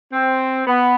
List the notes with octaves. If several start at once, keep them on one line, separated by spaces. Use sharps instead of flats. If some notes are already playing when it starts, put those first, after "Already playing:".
C4
B3